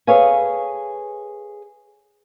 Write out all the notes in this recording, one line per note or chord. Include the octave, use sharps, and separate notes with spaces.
G#4 A4 B4 C#5 F5 G#5